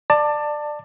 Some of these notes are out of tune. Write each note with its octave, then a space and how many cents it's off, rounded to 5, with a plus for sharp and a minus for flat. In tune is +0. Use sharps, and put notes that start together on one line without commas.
D5 +20 A5 +20